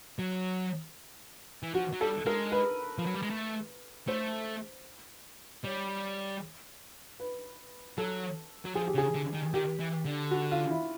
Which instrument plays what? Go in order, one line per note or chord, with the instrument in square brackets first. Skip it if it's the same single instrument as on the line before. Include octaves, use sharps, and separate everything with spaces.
[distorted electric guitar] F#3
E3
[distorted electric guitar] F3 [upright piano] F#4
[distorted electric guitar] F#3
[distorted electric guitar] G3 [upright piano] A4
[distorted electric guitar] G#3 [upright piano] A#4
[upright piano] B4
[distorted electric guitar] F3
F#3
G3
G#3
A3
[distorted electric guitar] A3 [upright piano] C5
[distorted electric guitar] G3 [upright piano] C#5
[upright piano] B4
[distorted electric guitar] F#3 [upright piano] A4
[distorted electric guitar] F#3
[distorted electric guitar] F3 [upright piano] G#4
[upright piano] G4
[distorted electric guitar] C#3
[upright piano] G#4
[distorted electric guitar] D3
D#3
[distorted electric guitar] D#3 [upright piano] G4
[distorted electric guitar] E3
D3
[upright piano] F#4
F4
E4